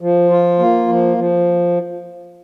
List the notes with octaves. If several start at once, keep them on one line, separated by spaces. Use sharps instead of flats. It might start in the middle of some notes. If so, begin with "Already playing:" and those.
F3
F4
A#3
F3
F3